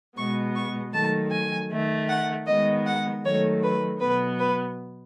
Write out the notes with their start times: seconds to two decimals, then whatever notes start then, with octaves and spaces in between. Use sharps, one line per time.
0.17 B2 G#3 B3 C#6
0.55 C#6
0.93 D#3 F#3 A3 A5
1.31 G#5
1.70 D#3 A3
2.08 F#5
2.46 D#3 G#3 B3 D#5
2.86 F#5
3.23 D#3 F#3 A3 C#5
3.63 B4
4.00 B2 F#3 B3 B4
4.39 B4